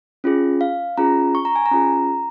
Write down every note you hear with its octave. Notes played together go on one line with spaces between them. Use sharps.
C#4 F4 G#4
F5
C#4 F4 G#4 A#5
C#6
A#5
G#5
A#5
C#4 F4 G#4